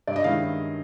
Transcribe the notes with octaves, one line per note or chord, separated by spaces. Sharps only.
G2 D5
D#5
D#3 G#3 C#4 E4 F5